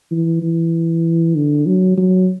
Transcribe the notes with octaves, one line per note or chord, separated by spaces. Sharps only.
E3
E3
D3
F#3
F#3